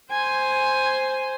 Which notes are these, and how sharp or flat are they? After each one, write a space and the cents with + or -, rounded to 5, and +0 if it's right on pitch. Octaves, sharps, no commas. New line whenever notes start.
C5 +0 G#5 +0